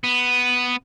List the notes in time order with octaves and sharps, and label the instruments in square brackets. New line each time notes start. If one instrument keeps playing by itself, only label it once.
[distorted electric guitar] B3